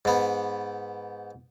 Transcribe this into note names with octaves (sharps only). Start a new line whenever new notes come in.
G#2 B3